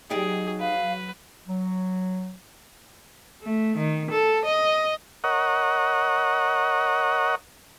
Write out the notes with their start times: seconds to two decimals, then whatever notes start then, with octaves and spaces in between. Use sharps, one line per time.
0.10 F#3 D#4 G4 G#4 D5
0.60 B4 F5
1.47 F#3
3.43 A3
3.77 D#3
4.11 A4
4.45 D#5
5.24 A#4 C#5 D#5 F#5